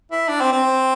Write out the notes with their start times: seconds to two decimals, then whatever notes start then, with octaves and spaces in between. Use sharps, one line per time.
0.12 E4
0.29 D4
0.41 C4
0.52 C4